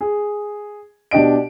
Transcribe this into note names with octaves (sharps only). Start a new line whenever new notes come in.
G#4
B2 D4 G4 D#5 D7